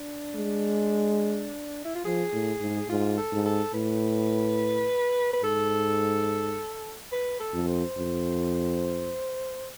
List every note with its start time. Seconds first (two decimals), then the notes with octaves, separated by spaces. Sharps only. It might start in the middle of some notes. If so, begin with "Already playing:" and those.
Already playing: D4
0.35 G#3
1.85 E4
1.95 F4
2.05 F3 G#4
2.33 A2
2.61 G#2
2.89 G#2 F4
3.18 A4
3.32 G#2
3.46 A4
3.74 A2 B4
5.33 B4
5.43 G#2 A4
7.12 B4
7.40 A4
7.54 F2
7.68 C5
7.97 F2